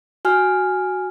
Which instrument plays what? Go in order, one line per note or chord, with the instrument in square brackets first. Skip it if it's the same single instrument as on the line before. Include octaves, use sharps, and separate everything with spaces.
[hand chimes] F#4 G#5 F6